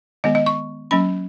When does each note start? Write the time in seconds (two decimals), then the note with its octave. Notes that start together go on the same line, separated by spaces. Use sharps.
0.24 D#3 G#3 B3 D#5
0.35 D#5
0.46 C#6
0.91 F#3 A#3 C#4 B5